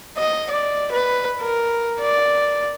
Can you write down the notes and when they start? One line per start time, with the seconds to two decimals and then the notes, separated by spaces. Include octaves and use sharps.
0.18 D#5
0.51 D5
0.92 B4
1.41 A#4
2.00 D5